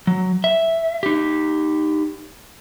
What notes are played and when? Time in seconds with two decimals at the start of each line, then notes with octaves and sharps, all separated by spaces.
0.07 F#3
0.44 E5
1.03 D#4 G4